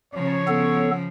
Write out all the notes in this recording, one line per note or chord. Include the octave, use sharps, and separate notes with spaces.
C#3 F3 C#5
B3 A4